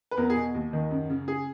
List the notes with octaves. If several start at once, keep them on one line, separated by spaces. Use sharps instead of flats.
B4
E2 A#4
G#4
B2
D#2
D#3
F#2
C#3
G#4